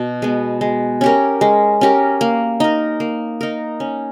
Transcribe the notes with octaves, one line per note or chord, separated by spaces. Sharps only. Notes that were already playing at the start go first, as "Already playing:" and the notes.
Already playing: B2
G#3 B3
G#3
C#4 G4 A#4
G#3
C#4 G4 A#4
A#3
D#4 A#4
A#3
D#4 A#4
C#4